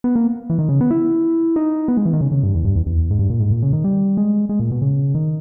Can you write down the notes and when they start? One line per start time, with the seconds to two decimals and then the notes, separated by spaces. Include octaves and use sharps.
0.04 B3
0.16 A#3
0.50 E3
0.59 D#3
0.69 C#3
0.81 B3
0.91 E4
1.56 D#4
1.88 B3
1.97 G#3
2.05 E3
2.13 D#3
2.21 C#3
2.32 C#3
2.43 G2
2.54 E2
2.65 G2
2.76 E2
2.86 E2
3.11 G#2
3.19 G2
3.30 A#2
3.40 G#2
3.51 A#2
3.62 C#3
3.73 D#3
3.84 G3
4.17 G#3
4.49 G#3
4.60 A#2
4.71 B2
4.82 C#3
5.15 D#3